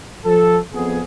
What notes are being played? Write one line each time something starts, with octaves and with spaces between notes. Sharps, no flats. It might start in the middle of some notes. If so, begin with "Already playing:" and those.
F3 A4
F2 B3 G#4